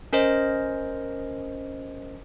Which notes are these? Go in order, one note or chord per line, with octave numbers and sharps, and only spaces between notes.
C#4 A#4 C5 D#5